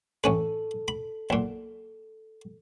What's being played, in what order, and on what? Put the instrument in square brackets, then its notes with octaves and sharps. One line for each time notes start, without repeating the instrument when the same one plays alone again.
[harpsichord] A1 C#4 B4 [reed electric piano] A4
[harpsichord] B5
B1 A#2